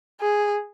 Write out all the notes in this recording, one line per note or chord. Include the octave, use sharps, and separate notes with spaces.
G#4